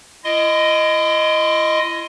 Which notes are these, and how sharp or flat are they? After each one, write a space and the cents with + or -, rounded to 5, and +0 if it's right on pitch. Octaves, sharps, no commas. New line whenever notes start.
E4 +40 D#5 +0 C6 +5